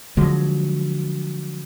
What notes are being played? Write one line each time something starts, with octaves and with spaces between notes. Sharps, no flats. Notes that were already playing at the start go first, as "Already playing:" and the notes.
D3 F3 F#3 G#3